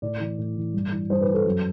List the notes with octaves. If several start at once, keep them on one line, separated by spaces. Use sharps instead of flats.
A2 D5
E3
A2
E3
G2
E3
G2 C5
B4
E3
A4
F#2